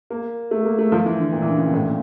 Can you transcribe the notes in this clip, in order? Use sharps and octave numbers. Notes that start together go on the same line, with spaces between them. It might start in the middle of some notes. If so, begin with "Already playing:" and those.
A#3
A3
A#3
A3
F3
E3
D3
A#2
E3
D3
C#3
A#2
A2
A#2